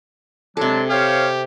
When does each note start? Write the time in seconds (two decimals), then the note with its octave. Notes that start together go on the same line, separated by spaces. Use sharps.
0.57 C3 F#3 G#3 D4 A4
0.90 G4 C5 C#5 F5